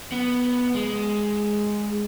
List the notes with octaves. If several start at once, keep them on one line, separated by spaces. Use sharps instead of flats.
B3
G#3